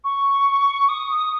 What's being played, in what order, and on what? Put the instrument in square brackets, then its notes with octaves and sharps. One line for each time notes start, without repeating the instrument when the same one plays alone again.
[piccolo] C#6
D#6